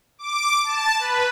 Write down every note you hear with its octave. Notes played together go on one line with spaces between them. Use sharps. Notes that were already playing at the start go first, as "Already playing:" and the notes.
D6
A5
B4